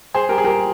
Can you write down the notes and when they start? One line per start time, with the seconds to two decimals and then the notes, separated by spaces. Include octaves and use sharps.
0.14 G#4 C5
0.29 G4 A#4
0.38 G#4
0.44 G4 A#4